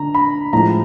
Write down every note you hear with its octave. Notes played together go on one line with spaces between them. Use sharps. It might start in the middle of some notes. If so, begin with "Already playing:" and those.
Already playing: D3 A#5
B5
A2 F3 G#3 A#5